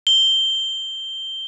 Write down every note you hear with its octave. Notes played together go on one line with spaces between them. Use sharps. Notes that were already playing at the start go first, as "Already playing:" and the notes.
G7